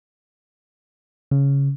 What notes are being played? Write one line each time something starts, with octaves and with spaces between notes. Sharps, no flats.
C#3